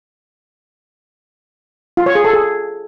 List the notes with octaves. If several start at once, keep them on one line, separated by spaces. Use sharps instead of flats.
F4
C#5
G#4
A4
G#4